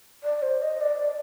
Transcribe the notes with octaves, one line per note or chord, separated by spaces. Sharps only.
D5
C5
D#5
D5